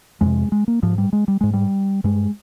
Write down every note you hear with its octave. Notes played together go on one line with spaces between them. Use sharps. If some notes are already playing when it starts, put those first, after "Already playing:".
F2 C3 G#3
G#3
A#3
G#2 F3
G3
G#3
G3
G#2 G#3
G3
G2 G#3